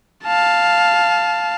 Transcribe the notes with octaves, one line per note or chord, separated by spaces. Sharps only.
F5 A5